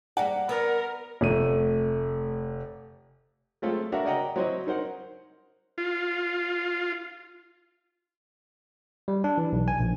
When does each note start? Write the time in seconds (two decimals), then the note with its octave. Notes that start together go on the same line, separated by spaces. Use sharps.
0.17 G3 A#3 D5 F#5
0.49 B3 A#4
1.21 F1 A3 D#7
3.62 F#3 G#3 A3 C4 F4 A4
3.92 D4 F#4 A#4 E5 F#5 A#5
4.05 A#4 D5 D#5 F#5 G5 A#5
4.36 F#3 C4 E4 F#4 C5 D#5
4.67 D#4 A#4 C5 F#5
5.78 F4
9.08 G3
9.24 D4
9.38 E3
9.53 B1
9.68 G#5
9.80 A#1